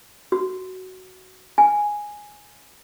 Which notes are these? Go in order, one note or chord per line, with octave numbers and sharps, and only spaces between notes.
F#4
G#5